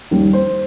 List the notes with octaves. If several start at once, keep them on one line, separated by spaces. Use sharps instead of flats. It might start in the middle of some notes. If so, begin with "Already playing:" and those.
D#2 D#3 G3
C5